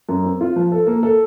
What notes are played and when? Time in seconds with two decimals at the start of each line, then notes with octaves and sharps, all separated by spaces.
0.09 F#2
0.25 C4
0.41 F4
0.56 F3
0.72 A4
0.87 A#3
1.03 A4